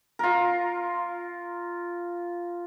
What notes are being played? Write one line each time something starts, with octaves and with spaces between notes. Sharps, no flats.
F4 A#4